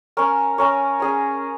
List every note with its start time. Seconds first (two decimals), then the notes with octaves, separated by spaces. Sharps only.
0.17 C#4 A#4 C#5
0.58 C#4 A#4 C#5
1.00 C#4 G#4 C#5